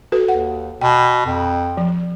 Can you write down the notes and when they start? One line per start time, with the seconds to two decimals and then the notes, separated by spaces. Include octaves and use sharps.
0.12 F#4 A4 B4
0.28 D#2 F#5
0.81 B2 G5
1.26 F2
1.77 F3